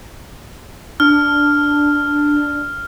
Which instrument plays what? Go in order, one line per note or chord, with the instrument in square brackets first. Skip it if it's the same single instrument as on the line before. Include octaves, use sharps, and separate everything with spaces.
[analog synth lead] D4 [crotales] F6